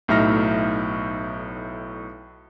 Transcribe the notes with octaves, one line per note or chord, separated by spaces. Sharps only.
B1 A2 D#4 E5 F6 A#6